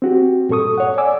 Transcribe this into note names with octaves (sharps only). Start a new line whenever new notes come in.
C4 F#4 G4
G2 A#2 A4 C#6 D#6
C#5 F#5
D5 G#5 D6 E6